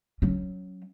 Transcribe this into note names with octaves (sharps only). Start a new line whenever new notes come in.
F#3 C#4